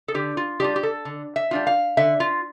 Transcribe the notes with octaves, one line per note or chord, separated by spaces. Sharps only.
A4
D3 G4
F4
G3 D4 F4 G4
G4
A4
D3
E5
G3 D4 F4
F5
D3 E5
F4